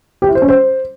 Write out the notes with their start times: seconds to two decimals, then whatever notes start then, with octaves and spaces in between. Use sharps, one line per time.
0.22 G4
0.29 E4
0.35 C5
0.42 C#4
0.49 C5